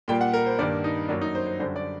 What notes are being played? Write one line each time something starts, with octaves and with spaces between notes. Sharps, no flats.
A#2 G3 A#3 G5
F#5
A#4
C5
G2 D#3 G3 A#3 D5
D#4
F#2 F#3 A#3 D4
D#4
C5
C5
F#2 D3 G3 C5
D5